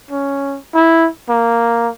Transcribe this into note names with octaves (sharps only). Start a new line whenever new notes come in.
C#4
E4
A#3